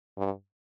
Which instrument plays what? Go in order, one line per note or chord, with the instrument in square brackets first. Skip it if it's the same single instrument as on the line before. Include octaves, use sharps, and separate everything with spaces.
[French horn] G2